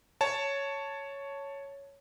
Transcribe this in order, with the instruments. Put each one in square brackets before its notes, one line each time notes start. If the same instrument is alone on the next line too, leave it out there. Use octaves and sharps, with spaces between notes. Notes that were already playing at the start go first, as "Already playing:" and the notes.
[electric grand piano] C#5 A5